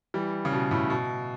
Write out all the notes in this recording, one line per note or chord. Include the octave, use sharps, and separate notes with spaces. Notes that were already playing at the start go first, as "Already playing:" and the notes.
E3 G3
C#3
B2
A2 C#3
B2